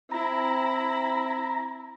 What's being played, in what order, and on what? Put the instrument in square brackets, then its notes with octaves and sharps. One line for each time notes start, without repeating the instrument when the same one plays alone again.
[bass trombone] C4 [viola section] E4 [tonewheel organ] A#5